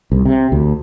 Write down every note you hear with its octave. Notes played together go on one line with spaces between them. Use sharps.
C2
C3
D2